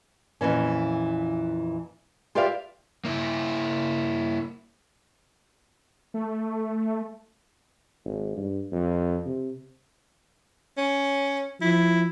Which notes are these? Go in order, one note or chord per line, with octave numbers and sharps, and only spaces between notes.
F2 A#2 E3 C#4
F4 G4 B4 D5 E5 F5
A#3 E4
A3
G#1
G2
F2
C3
C#4
F3 E4